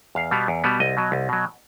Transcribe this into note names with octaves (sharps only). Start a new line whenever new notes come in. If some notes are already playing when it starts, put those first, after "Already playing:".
E2 F5
B2 G3 B3
E2
B2 G3 B3
C2 D#5
B2 F#3
C2
B2 F#3